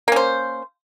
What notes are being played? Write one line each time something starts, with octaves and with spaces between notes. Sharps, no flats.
A#3 C#4 C5